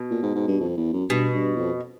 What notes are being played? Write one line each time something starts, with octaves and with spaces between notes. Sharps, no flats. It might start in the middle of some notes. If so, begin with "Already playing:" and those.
Already playing: B2
A#2
G#2
G#2
G2
F2
E2
F#2
G2 B2
G2
E2
F2